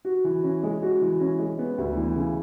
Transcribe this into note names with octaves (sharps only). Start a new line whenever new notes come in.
F#4
E3
C#4
G#3
F#4
E3
C#4
G#3
B3
D2
E3
C#3